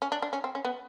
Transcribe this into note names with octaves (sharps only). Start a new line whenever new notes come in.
C#4
D4
D4
C#4
C4
C#4
B3